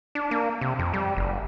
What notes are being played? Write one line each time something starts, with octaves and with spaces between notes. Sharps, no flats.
D4
A#3
C3
F2
G3
F#1